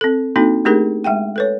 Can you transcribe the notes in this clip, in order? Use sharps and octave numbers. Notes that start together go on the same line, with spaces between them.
C4 A4
A#3 C4 D4 D#4 F#4 A4
A3 D4 D#4 G4 G#4 A#4
G#3 E5 F#5 G5
A4 B4 C#5